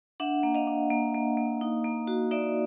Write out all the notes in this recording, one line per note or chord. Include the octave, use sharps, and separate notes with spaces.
D4 E5 F#5
A#3
D#5 F5
D4
A#3
A#3
A#3
D#4
A#3
F#4
D#4 D5 E5